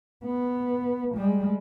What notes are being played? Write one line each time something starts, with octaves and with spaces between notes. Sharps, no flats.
B3
G3 G#3